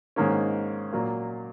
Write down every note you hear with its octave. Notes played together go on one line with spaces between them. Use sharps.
G#2 D#3 A#3 C#4
A#2 F#3 A#3